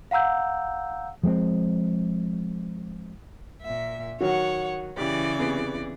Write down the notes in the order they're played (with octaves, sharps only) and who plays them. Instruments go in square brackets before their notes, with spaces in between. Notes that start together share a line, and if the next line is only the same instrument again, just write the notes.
[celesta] F5 F#5 A#5 E6 G6
[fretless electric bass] F3 G#3 B3 C4
[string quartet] A#2 E5
[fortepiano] D#3 F#3 F#4 [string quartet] C#5 F#5
[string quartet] C#3 E3 D5 [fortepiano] G4
[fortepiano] C3 B3 G#4